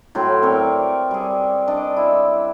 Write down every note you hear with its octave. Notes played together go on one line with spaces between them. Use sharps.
A2 F#3 G5 C6
C4 A#4 C#5 D5
G3 G#4
D4 D5 D#5
E4